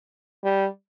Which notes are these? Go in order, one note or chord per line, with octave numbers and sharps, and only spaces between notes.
G3